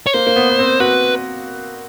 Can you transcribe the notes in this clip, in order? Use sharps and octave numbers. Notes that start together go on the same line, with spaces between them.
C#5
A#3 C5
A#3
B3
B3
C4
F#4 B4